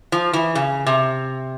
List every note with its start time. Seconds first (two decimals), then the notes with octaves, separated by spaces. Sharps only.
0.12 F3
0.33 E3
0.55 C#3
0.86 C3